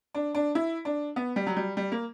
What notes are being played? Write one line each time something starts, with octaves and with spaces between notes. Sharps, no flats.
D4
D4
E4
D4
B3
G3
F#3
G3
G3
A#3